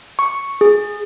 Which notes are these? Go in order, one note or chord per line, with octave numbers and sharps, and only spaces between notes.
C#6
G#4